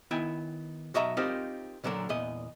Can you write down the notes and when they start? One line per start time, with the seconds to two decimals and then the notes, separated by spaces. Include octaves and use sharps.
0.11 D#3 B3 E4 G5 G#5
0.94 B1 F#4 D#5 E5 A5 A#5
1.17 C4 D#4 F4 G4 A#4 C5
1.84 A#2 D3 F#3 A4 A#4
2.09 E2 A#2 D#5